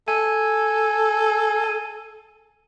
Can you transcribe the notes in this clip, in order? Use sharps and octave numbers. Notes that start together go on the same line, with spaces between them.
A4 G#5